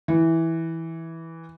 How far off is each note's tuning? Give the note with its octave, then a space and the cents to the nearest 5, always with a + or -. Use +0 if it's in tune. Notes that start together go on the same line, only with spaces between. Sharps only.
E3 -10